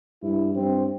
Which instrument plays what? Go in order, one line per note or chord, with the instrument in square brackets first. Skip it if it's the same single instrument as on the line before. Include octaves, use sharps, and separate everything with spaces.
[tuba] G2 [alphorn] E4
[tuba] G2 [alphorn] C4